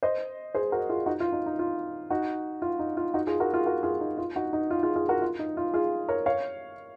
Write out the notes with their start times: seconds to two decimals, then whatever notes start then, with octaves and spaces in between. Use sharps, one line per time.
0.03 C5 D#5
0.55 G#4 C5
0.72 F#4 A#4
0.89 F4 G#4
1.06 D#4 F#4
1.20 F4
1.33 D#4
1.46 D#4
1.59 F4
2.10 D#4 F#4
2.62 F4
2.79 D#4
2.97 F4
3.14 D#4 F#4
3.27 F4 G#4
3.40 F#4 A#4
3.53 F4 G#4
3.66 F#4 A#4
3.83 F4 G#4
4.01 D#4
4.18 F4
4.36 D#4 F#4
4.53 D#4
4.71 F4
4.83 F4 G#4
4.96 F4 G#4
5.09 F#4 A#4
5.22 F4
5.39 D#4
5.57 F4
5.74 F4 G#4
6.09 A#4 C#5
6.26 C#5 F5